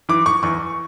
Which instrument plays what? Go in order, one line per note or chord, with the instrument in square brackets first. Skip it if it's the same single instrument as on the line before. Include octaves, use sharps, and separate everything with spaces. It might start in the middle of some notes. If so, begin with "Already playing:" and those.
[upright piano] E3 D6
C#6
E2 C#6